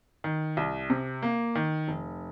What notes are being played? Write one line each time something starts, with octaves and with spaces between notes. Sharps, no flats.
D#3
C2
C3
A#3
D#3
F1